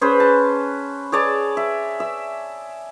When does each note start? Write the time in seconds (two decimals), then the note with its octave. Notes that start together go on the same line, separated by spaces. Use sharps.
0.01 C#4 G#4 B4 C5
0.20 A5
1.12 G#4 C#5 D5 A5
1.57 E5
2.00 E5